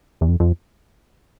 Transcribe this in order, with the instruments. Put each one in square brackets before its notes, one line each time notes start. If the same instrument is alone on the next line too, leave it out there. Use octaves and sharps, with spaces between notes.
[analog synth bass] E2
F2
F2